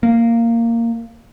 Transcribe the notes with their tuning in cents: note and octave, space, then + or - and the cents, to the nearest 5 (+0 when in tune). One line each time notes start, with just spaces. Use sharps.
A#3 -10